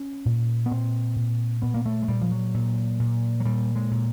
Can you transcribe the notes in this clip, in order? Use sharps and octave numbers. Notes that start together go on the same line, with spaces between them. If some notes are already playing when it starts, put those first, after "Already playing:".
Already playing: C#4
A#2
B3
A#2 C4
A#2
A#2 B3
A#3
A3
G#3
A#2 G3
F3
F#3
A#2
A#2
F#3
A#2 G3
G#3
A#2